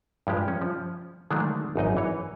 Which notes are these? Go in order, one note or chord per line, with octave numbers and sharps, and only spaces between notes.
G2 F3 G#3 G4
C#4
F3
D3 D#3 F#3 G#3 A3 D4
G#1 F#2 D#4 D#5
E3 C#5